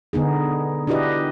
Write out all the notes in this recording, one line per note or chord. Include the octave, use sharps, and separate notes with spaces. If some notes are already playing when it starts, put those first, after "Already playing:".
D3 B3 D#4 G#4
D4 E4 F#4 G4 B4 D#5